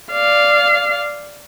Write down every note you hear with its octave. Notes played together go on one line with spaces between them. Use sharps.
D5 F5